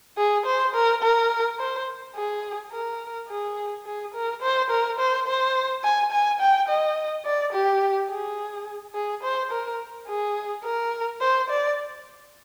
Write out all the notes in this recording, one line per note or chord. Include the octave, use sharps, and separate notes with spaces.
G#4
C5
A#4
A#4
C5
G#4
A#4
G#4
G#4
A#4
C5
A#4
C5
C5
G#5
G#5
G5
D#5
D5
G4
G#4
G#4
C5
A#4
G#4
A#4
C5
D5